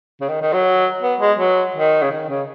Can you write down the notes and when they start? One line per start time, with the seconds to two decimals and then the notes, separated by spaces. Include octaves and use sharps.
0.21 C#3
0.29 D#3
0.42 D#3
0.53 F#3
1.02 B3
1.20 G#3
1.38 F#3
1.75 D#3
2.02 C#3
2.12 D#3
2.29 C#3